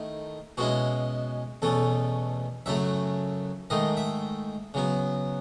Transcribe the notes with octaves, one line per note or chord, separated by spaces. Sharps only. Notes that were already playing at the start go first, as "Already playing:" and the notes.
Already playing: D#3 A3 E4
B2 G#3 C#4 E4 F#4
E2 B2 A3 C#4 A4
F#2 C#3 F#3 A3 E5
G#2 D#3 A3 D#5
E5
C#3 F#3 B3